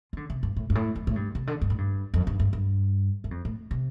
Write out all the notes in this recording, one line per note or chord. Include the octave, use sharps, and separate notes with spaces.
F3
D3
C3
G2
A2
G2
A2
F2
A2
G2
C3
D3
G2
A2
G2
F2
G2
G2
G2
G2
F2
A2
C3